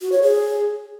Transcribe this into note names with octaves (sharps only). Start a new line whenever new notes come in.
F#4
C#5
G#4